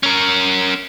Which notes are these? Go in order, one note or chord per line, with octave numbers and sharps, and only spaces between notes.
C#4 A#4